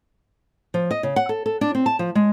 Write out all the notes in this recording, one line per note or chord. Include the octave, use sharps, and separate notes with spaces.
F3
D#5
C#3
F#5
A4
A4
D4
C4
A5
F3
G#3